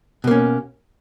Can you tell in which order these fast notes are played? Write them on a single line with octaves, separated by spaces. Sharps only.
B2 A#3 C#4